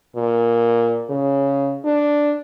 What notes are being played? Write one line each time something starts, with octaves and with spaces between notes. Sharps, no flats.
A#2
C#3
D4